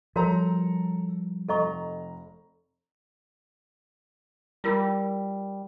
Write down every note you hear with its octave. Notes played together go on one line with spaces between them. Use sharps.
F3 G3 F#4 A4 A#4 C#5 A#5
F1 A4 D#5 A#5 C#6
G3 E4 F4 A#4